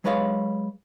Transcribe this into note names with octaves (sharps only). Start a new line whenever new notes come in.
F#3 G#3 B4 C#5 D5 F5